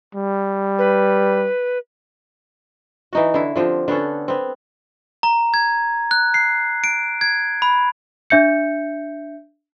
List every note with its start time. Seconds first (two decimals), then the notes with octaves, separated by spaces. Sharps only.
0.15 G3
0.78 B4
3.13 E3 D#4 F#4
3.34 D3 E4
3.56 D3 F3 C4 G4
3.88 D3 B3 C#4 A4
4.28 B3 C4
5.23 A#5
5.54 G#6
6.11 F#6
6.34 C7
6.84 D7
7.21 G#6
7.62 B5
8.30 D4 E5 G6 C#7